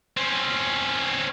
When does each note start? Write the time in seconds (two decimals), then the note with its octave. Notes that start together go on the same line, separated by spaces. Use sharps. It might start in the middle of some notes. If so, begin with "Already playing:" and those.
0.17 C4 C#4